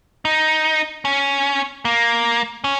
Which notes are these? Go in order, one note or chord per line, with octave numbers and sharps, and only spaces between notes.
D#4
C#4
A#3
C#4